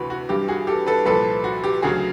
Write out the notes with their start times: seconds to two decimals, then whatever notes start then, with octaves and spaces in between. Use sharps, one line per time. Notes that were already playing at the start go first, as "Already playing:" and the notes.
Already playing: D2 C3 E3 F#4 B4
0.10 F#4
0.29 G2 E3 G4
0.48 F#4 G#4
0.67 G4 A4
0.87 A4 B4
1.06 C2 A#2 F3 A4 B4
1.44 F#4
1.64 G4
1.82 D2 C#3 F#3 F#4 G#4